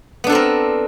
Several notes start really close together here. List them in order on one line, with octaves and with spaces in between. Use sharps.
B3 D4 A4 C4 A#4